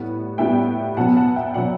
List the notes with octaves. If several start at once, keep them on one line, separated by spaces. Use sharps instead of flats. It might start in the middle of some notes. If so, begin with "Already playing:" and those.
Already playing: A2 G3 B3
A2 G3 B3 E5 G5
B2 F#3 B3 F#5 A5
F#5 A5
E5 G5
B2 F#3 B3 D5 F#5